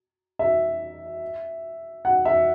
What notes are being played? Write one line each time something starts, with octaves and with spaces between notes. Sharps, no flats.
E5
F#5
E5